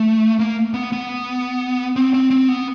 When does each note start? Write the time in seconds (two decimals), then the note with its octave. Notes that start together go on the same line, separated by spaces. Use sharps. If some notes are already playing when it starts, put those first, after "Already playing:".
Already playing: A3
0.39 A#3
0.74 B3
0.92 B3
1.96 C4
2.14 C4
2.30 C4
2.48 B3